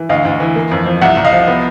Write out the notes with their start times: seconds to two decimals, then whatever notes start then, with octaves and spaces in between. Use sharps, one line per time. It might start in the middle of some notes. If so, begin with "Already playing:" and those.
Already playing: E3
0.09 D2 D#5 F5
0.25 D2
0.40 E3
0.56 A#3
0.71 F2
0.86 F3
1.01 C2 E5 F#5
1.17 C2
1.24 D#5 F5
1.33 F3
1.48 B3